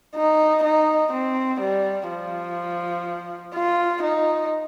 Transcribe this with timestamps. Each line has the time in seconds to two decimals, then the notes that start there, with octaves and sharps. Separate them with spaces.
0.16 D#4
0.64 D#4
1.13 C4
1.61 G3
2.10 F3
3.55 F4
4.03 D#4